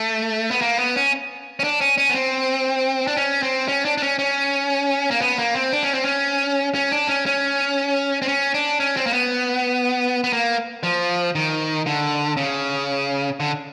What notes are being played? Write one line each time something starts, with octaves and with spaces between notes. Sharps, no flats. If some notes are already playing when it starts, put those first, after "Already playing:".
Already playing: A3
B3
A#3
B3
C#4
C#4
D4
C#4
C#4
B3
C4
D4
C#4
C4
C#4
D4
D4
C#4
C#4
A#3
B3
A#3
C4
D4
C#4
C4
C#4
C#4
D4
C#4
C#4
C4
C#4
D4
C#4
C4
A#3
B3
B3
A#3
F3
D#3
D3
C#3
D3